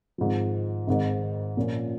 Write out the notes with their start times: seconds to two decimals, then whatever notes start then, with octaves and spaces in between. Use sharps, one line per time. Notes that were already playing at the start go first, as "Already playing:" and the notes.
0.18 G#1 G#2 F3
0.87 G#1 G#2 D#3
1.57 A#2 F3 C#4